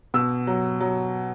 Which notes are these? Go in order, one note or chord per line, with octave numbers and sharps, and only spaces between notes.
B2 E6
F#3
F#3